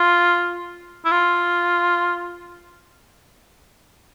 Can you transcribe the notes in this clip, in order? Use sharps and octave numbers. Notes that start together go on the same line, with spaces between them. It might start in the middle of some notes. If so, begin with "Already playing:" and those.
Already playing: F4
E4
F4